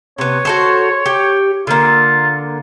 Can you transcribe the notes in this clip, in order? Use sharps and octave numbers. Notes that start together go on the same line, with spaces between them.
C3 B3 C#5
F#4 A4 C5
G4
D3 A#3 F4